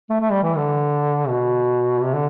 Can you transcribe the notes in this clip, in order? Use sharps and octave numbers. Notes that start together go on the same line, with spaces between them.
A3
A3
G3
E3
D3
B2
C3
D3